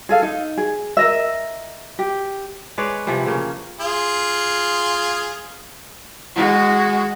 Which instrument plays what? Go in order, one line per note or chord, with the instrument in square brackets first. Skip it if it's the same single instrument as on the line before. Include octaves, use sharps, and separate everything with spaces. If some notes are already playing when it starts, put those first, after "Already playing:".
[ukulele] G#4 A4 F5
D#4
G#4
A#4 D#5 E5
G4
[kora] G#3 B4 C#5 D5
C3 E3 F3 G3
C#3 A#3 C#4
[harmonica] F4 G#4
[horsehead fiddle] G#3 F#4